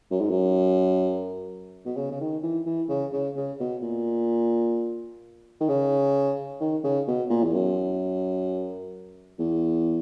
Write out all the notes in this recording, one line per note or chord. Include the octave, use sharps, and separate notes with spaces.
F#2
G#2
F#2
B2
C#3
C#3
D#3
E3
E3
C#3
C#3
C#3
B2
A#2
D#3
C#3
D#3
C#3
B2
A#2
E2
F#2
E2